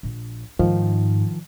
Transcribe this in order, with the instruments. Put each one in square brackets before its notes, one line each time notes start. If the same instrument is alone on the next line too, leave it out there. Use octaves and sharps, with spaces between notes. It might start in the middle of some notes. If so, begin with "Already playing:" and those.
[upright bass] A#1
[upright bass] G#2 [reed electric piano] D#3 F3